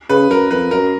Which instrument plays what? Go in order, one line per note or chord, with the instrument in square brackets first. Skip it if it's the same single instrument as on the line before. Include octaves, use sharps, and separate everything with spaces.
[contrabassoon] C#3 [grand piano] B4
[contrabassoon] F#2 [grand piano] A#4
[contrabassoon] F2 [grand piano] B4
[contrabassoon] F#2 [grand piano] A#4